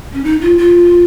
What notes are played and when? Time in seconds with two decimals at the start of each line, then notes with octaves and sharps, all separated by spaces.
0.13 C#4
0.24 D#4
0.41 F4
0.58 F4